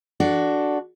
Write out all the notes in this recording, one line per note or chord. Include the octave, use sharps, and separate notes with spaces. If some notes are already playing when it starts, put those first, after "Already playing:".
D4 F#4 A4